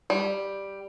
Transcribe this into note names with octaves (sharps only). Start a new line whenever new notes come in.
G3